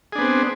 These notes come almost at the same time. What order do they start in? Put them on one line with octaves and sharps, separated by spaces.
G#4 D4 B3 C4